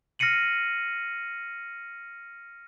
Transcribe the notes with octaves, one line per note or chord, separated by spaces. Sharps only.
F6 A#6 C7 C#7 D#7 F#7